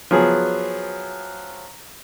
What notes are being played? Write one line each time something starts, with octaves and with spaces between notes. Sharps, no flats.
F3 F#3 B3 G#4